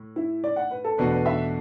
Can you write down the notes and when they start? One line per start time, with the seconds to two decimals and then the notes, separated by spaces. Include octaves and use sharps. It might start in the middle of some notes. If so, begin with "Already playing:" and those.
Already playing: A2
0.16 E4
0.44 D5
0.56 F#5
0.71 B4
0.84 A4
0.98 E2 B2 A3 D4 F#4 B4
1.12 B4
1.26 E5